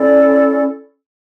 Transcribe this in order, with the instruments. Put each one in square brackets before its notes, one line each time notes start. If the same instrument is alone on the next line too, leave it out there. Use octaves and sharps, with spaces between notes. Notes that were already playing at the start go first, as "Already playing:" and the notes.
Already playing: [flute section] C#4 E4 A4 D5